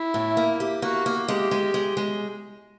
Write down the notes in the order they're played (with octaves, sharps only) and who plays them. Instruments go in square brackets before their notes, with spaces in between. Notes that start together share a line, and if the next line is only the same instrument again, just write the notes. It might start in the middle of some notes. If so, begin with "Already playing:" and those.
Already playing: [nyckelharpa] E4
[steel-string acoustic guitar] A2
A#3
G4
[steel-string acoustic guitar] A#3 [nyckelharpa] F#4
[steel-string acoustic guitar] A#3
[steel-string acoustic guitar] G#3 [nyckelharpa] G4
[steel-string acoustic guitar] G#3
G#3
G#3